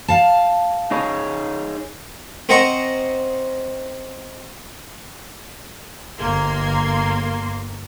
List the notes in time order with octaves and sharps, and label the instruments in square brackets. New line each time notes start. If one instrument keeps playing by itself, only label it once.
[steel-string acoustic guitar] F5 A5
[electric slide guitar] D#4 G#4 C#5
[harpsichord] C4 C5 D#5 F#5 A#5 C#6
[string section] G1 A#3 C6 G#6